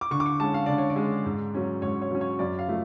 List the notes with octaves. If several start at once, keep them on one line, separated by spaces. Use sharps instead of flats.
D6
D3 C#6
D6
C#6
G#3 C#4 A5
F5
D3 D5
C#5
D5
G#3 C#4
G#2
F#3 C#4
G#2 C#5
C#5
F#3 C#4
C#5
F#2 D5
F5
F3 A3